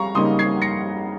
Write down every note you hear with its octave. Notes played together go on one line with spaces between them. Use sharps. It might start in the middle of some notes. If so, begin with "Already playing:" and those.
Already playing: C#3 G3 F5 A#5 C#6
C#3 G3 A#3 D#4 C6 D#6
G#6 C7
A#6 C#7